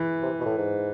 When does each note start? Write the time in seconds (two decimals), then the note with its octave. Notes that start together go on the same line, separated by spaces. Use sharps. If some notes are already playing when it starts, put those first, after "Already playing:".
Already playing: E3
0.23 C3
0.40 B2
0.46 A2
0.58 G#2